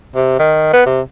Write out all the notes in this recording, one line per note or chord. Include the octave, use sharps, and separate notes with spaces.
C3
D#3
B3
C3